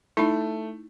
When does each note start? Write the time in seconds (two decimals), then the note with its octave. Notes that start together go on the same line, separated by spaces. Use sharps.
0.17 A3 D#4 E4